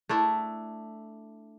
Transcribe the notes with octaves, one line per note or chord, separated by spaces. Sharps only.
A3 D4 E4